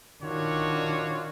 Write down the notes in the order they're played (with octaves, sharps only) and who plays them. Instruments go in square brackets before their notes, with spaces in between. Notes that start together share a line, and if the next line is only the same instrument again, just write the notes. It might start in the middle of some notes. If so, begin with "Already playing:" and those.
[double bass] D#3 D4 [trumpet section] F4 F#4 C#5